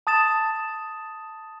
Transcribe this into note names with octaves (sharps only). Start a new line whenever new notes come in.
A5 D#6 A6 E7